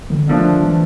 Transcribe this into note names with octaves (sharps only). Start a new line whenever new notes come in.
D3
D3 D#3 F3 A3 D4
E3